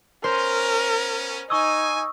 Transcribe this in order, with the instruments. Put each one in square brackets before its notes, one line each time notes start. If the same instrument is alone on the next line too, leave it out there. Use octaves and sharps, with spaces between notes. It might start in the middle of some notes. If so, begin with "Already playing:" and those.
[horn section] B3 C#4 [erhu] A#4 [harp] C5
[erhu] D#4 [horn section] G#5 [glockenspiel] C#6 D#6 E6